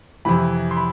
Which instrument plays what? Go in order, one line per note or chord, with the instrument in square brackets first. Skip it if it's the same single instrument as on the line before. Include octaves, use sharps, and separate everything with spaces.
[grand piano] F2 C3 E3 B5
C6
B5